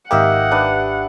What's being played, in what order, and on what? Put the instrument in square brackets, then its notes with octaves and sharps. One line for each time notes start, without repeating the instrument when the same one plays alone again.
[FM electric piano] G#1 G4 [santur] A#3 D#4 E5 [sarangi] F#5
[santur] D4 B4